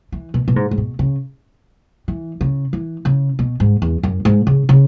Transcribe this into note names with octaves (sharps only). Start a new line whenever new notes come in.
E3
B2
B2
G#2
G#2
B2
C#3
E3
C#3
E3
C#3
B2
G#2
E2
F#2
G#2
C#3
C#3